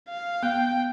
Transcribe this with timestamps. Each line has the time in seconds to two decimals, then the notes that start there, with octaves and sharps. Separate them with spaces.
0.09 F5
0.43 B3 G5